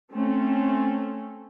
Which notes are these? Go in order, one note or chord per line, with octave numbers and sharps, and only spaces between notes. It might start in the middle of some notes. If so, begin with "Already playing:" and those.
A3 C4 C#4 A4